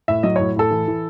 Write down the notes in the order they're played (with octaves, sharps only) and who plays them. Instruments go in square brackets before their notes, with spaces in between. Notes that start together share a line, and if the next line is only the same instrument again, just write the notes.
[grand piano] A2 E5
F#3 D#5
A2 C#5
A2 A4
E3
E3